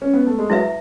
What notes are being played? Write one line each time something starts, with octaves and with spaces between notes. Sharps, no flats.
C#4
B3
A3
G#3
F#3 E4 B4 E5